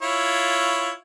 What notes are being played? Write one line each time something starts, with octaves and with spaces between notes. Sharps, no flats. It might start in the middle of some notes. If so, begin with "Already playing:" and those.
E4 F4 C#5